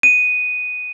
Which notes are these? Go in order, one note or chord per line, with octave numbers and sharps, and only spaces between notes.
D#7